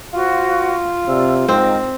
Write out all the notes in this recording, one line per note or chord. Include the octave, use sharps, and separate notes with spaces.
F4 F#4 C5 F5
C3 D5 E6
G#2 C4 A#4 D#5 G5